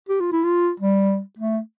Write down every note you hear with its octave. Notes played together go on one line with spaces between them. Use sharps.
G4
F4
E4
F4
G3
A3